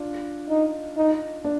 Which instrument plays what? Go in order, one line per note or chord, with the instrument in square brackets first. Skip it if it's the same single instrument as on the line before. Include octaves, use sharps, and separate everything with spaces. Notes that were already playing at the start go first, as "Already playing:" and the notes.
Already playing: [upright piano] D4 F4
[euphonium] D#4
D#4
[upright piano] D4